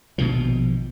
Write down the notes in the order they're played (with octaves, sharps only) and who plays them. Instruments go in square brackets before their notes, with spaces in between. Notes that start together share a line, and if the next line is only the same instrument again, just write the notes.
[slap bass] A#1 B2 D#3 F3